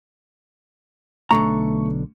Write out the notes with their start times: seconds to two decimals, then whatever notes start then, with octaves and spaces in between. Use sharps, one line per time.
1.31 B1 D3 A3 A#5 C#6